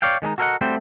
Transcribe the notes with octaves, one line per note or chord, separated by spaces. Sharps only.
C#5 D5 F5 G5
D#3 G#3 C#4 D#4
F#4 A4 A#4 C5 D#5 F#5
G3 A3 C4 F#4 C5